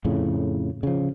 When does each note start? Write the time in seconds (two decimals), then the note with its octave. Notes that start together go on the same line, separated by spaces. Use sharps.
0.05 F2 A2 C#3
0.83 C#3 F3